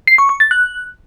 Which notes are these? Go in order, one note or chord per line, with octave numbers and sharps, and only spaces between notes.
C7
C#6
C#6
A6
F#6